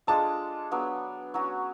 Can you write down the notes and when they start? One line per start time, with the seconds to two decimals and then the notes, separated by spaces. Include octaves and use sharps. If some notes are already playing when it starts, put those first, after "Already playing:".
0.07 G#3 D4 F4 A4 A5
0.71 F#3 B3 D4
1.34 F#3 C#4 F#4